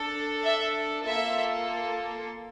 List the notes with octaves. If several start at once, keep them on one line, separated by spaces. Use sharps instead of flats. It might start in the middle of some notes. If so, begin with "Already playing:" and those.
Already playing: D4 A4
E5
A#3 F4 A4 E5